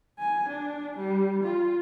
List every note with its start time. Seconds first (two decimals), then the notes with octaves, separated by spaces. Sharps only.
0.19 G#5
0.49 D4
0.97 G3
1.43 F4